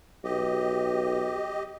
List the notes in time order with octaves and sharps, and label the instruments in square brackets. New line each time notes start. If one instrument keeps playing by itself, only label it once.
[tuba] B1 [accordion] G4 D#5